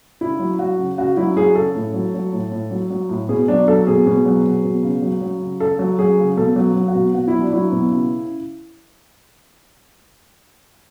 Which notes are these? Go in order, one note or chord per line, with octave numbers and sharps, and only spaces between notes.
C#3 E4
F#3
F#3 F#4
C#3
C#3 F#4
F#3 E4
F#3 G#4
C#3 A4
A2
F#3
F#3
A2
A2
F#3
F#3
A2
B2 G#4
F#3 D4
F#3 A4
B2 G#4
B2
F#3
F#3
B2
C#3
F#3
F#3
C#3
C#3 A4
F#3
F#3 G#4
C#3
B2 A4
F#3
F#3
F#4
B2
B2 F#4
E4
F#3
D4
F#3 E4
B2
C#3